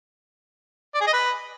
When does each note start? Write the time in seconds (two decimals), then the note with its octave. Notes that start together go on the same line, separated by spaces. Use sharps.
0.94 D5
1.01 G#4
1.07 D#5
1.13 B4